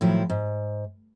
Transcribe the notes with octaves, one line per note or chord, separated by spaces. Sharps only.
A2 D#3 F3 F#3 E4 F4
G#2